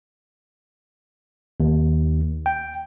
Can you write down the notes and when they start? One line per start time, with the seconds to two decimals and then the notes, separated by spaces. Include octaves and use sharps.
1.60 D#2
2.46 G5